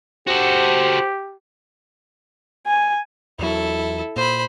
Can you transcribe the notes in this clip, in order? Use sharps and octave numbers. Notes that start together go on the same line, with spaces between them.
F#4 G4 A4 C5
G#5
E2 F#3 E4 A4
A#2 C5 B5